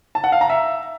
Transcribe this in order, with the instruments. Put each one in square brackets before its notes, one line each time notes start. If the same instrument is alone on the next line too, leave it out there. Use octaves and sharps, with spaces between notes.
[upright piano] A5
F#5
F5
A#5
E5